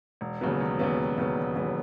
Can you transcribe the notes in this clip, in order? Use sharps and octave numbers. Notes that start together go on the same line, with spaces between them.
E1
D#2 C#3 F#3 B3
E1
D#2 C#3 F#3 B3
E1
D#2 C#3 F#3 B3
E1
D#2 C#3 F#3 B3